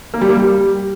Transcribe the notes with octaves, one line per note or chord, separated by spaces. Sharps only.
A#3
G3
A#3
G3